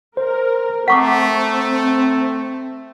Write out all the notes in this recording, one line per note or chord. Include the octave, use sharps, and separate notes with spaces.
A#4 C5
A3 C4 F#5 A#5 C#6 D6 B6